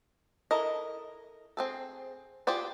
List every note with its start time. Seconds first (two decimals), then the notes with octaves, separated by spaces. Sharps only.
0.51 E4 A4 A#4 D#5
1.57 C4 G#4 A4
2.47 F4 G4 G#4 C5 D5